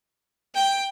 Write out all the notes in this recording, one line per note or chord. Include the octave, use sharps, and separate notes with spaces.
G5